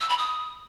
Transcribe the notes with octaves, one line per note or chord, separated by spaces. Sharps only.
E6
B5
D#6